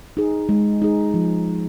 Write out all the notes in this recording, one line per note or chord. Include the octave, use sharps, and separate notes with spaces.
D#4 G#4
G#3
D#4 G#4
F3